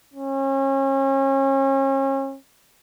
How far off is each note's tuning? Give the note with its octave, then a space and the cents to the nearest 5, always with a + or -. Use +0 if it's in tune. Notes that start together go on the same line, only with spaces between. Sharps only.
C#4 -35